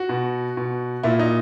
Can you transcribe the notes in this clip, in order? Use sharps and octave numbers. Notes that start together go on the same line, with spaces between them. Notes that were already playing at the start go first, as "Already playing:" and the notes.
Already playing: F#4
B2
B2
A#2 E4
D#4